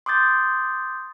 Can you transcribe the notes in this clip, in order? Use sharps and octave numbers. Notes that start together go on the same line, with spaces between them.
C6 D6 D#6 G6 A6